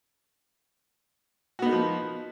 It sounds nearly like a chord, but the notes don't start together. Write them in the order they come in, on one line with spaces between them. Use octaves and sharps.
F#4 B3 D#4 A#3 F3